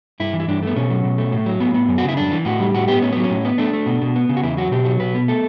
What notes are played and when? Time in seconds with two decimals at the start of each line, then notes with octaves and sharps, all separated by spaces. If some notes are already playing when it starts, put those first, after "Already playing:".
0.20 G2 E4
0.33 E3
0.40 E4
0.48 G2 D4
0.63 A3 B3
0.76 B2 C#4
0.90 F#3
1.05 B2
1.18 A3
1.32 A2
1.46 F#3
1.60 A2 B3
1.74 B3
1.89 F#2
1.98 F#4
2.04 C#3 E4
2.17 F#2 D4
2.32 E3
2.45 A2 F#4
2.60 G3
2.74 A2 F#4
2.88 B3 G4
3.02 A2 C#4
3.12 F#3 B3
3.24 C#4
3.30 A2
3.45 B3
3.58 A3 D4
3.73 A3
3.86 B2
4.02 B2
4.16 B3
4.29 C#3
4.36 F#4
4.43 E2 E4
4.57 F#3 F#4
4.72 B2 G4
4.85 F#3
5.00 B2 B4
5.15 B3
5.28 A3 A4